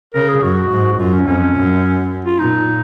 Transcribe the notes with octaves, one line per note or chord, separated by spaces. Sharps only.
C#3 A#4
G#4
F#2 F#4
G#2
F#4
F#2 F4
C#4
F2 C#4
F#2
F4
A#2 D#4